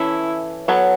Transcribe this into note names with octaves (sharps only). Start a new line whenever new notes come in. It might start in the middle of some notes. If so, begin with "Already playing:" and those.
Already playing: E3 C#4 E4 A4 C#5
F#3 B3 A4 C#5